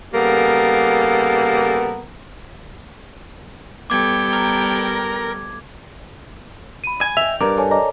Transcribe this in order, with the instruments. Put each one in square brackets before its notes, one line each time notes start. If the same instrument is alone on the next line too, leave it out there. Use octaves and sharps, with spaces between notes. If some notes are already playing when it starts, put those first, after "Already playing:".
[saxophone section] C#3 G3 A#3 B3 A4 A#4
[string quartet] G3 G5 [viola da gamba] B3 A4 [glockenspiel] D6 G#6
[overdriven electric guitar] A#4
[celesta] B5 D#7
[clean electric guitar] G#5
[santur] D#5 G5 [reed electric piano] E5 [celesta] F7
[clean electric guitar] G2 [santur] A#4 [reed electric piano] D6
[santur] A4 C#5 G#5
[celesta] D5 D#5 D6 [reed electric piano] A#5